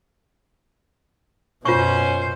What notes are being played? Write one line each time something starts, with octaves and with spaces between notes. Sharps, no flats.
F#2 B2 C#4 F4 C5 C#6